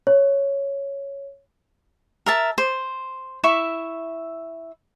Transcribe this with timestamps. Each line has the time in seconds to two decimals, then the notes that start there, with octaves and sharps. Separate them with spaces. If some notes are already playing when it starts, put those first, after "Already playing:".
0.07 C#5
2.26 A#4 E5 A5
2.58 C5
3.44 E4 E5 C#6